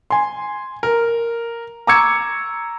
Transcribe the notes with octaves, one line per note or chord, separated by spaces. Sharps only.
G#5 C6
A#4
A#5 C#6 D6 E6 G#6 C#7